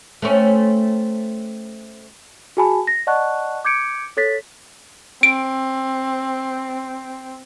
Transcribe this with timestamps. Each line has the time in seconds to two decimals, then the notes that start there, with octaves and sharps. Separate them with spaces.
0.22 A3 C4 C#4
2.57 F#4 G#4 G#5 A5 B5
2.87 A#6
3.07 D5 D#5 F#5 A5 C#6 F#6
3.65 D6 G6 G#6 C#7 D7
4.17 A4 C#5 A6 B6
5.23 C4 D7